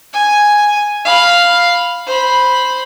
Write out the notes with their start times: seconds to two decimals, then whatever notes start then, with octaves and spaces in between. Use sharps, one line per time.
0.13 G#5
1.05 F5 B5
2.06 C5 B5